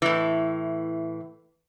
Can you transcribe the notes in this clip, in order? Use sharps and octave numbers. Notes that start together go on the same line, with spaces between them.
A2 E3